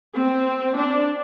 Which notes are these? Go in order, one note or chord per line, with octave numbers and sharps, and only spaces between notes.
C4
D4